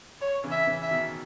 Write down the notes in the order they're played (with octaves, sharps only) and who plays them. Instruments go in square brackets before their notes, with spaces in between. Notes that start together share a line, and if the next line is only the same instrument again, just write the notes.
[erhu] C#5
[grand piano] C#3 E3
[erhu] E5
[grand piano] C#3 E3
[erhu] E5
[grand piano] B2 D#3